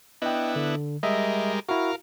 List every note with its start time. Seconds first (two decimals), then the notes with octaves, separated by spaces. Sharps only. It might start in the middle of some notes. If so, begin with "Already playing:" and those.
0.22 B3 D4 E4 D#5 G5
0.56 D3
1.03 G3 G#3 A#4 D#5 E5
1.69 E4 F#4 A#4 F5